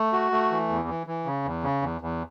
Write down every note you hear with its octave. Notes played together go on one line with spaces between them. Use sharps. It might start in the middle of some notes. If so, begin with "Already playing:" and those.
Already playing: A3
F#4
A3
E3
E2
E3
E3
C#3
E2
C#3
E2
E2